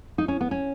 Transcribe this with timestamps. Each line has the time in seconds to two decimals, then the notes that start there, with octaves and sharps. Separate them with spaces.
0.18 D#4
0.28 C#4
0.41 B3
0.51 C#4